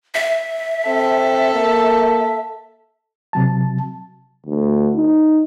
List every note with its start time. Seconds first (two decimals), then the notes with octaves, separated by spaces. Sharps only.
0.15 E5
0.87 C4 A4
1.54 A#3
3.33 C3 F#3 A5
4.46 D2
4.97 D#4